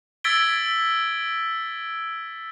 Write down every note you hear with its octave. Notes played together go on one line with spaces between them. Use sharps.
E6 G#6 A6 B6 D7 G7